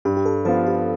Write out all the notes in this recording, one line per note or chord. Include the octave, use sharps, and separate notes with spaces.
G2 G4
G4
A4
F3 B3 F4 A4
G4